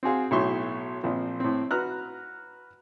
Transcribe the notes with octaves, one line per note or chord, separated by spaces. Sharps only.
C4 F#4 G#4 F5
B1 A2 F#3 E5 C6 C#6
A#1 F3 C4
A2 C4
F#4 B4 A#5 F6 F#6